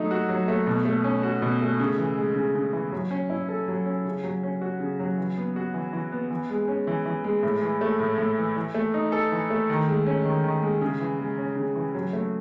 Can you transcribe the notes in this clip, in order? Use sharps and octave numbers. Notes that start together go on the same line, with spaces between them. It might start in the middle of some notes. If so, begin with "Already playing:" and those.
Already playing: F#3 A3 D#4
F#4
F#3
A3
B2
A3
C#4
F#4
B2
A3
C#3
E3
G#3
C#3
C#3
E3
F#3
C#4
E4
A4
F#3
C#4
C#3
F#3
C#4
F#4
C#3
F#3
E3
B3
F#4
E3
E3
B3
E3
G#3
C#4
E3
E3
G#3
A2
E3
A3
A2
A2
E3
E3
A3
D#4
A4
E3
A3
D#3
G#3
C#4
D#3
D#3
G#3
C#3
E3
G#3
C#4
C#3
E3
F#3
A3